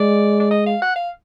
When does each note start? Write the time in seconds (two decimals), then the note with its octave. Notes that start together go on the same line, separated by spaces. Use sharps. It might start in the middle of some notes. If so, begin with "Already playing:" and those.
Already playing: G#3 D5
0.40 D5
0.51 D#5
0.66 F5
0.82 F#5
0.96 F5